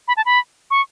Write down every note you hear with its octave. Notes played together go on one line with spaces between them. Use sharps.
B5
A5
B5
C#6